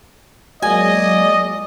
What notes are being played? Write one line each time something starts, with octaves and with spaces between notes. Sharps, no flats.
E2 F#3 G#3 A#3 F4 D5 D#5 G#5